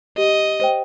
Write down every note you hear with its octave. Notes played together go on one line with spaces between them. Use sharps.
G4 D#5
C5 G5